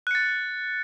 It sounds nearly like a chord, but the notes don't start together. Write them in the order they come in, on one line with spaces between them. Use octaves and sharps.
F#6 C#7 A6